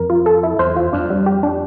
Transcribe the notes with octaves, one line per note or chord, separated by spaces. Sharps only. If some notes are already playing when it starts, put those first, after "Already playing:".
Already playing: F2 A#4
F4
A4
E4
E2 C5
F4
F2 D4
G3
G4
D4